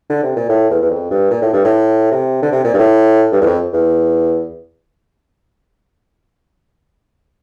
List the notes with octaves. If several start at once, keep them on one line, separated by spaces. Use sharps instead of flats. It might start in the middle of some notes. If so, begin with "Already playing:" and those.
D3
C3
A#2
A2
E2
E2
F2
G2
A#2
A2
G2
A2
C3
D3
C3
A#2
G2
A2
G2
E2
F2
E2